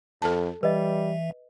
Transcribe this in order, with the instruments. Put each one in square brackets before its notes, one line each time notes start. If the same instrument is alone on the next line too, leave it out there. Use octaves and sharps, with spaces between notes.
[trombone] F2 [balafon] A4 A5
[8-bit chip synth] E3 E5 [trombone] G3 [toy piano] B4 D#5